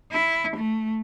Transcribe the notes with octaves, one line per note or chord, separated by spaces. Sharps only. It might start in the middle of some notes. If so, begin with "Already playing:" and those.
E4
A3